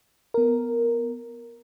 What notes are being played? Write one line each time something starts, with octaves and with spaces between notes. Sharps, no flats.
B3 A#4